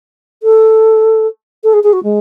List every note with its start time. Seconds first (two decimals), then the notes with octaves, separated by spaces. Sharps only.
0.43 A4
1.63 A4
1.73 G#4
1.83 G#4
1.93 F#4
2.03 G#3